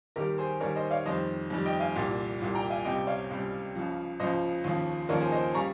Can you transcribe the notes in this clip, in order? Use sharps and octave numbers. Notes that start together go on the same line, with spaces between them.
D#2 D#3 G3 G4 A#4
G#4 C5
D#2 D#3 G3 A#4 C#5
C5 D#5
C#5 F5
F2 D#3 G3 C5 D#5
F2 D#3 G3
D#5 G5
F5 G#5
C2 A#2 G3
C2 A#2 G3
G5 A#5
F5 G#5
C#2 C3 G3 D#5 G5
C#5 F5
C#2 C3 G3
C#2 C#3 F3
C#2 C#3 F3 C5 D#5
D#2 C#3 F3
D#2 C#3 F3 A#4 C#5
G#4 C5
C5 D#5
C#3 G3 A#5 C#6